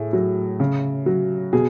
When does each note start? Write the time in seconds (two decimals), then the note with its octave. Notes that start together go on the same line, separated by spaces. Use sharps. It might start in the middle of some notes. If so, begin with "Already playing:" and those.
Already playing: A2 G#4
0.13 F#3
0.60 C#3
1.06 F#3
1.53 B2 G#4